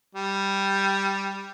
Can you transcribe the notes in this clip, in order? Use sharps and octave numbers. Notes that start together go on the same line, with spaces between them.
G3